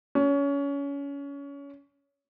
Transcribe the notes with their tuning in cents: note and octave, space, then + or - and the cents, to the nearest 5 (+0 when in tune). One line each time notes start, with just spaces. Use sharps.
C#4 +25